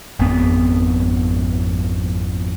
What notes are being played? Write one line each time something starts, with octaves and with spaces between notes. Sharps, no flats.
G#1 F2 B3